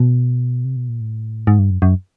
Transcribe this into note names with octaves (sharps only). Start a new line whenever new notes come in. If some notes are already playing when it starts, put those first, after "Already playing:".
Already playing: B2
C3
B2
A#2
A2
G#2
G2
F#2
F#2